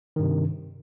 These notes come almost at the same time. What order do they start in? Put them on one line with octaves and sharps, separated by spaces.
D#3 G2 C3